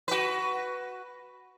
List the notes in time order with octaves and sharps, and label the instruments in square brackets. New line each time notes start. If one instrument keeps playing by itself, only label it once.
[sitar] F#4 B4